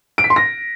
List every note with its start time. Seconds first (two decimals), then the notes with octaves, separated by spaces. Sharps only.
0.18 D7
0.24 B6
0.30 C6
0.36 A#6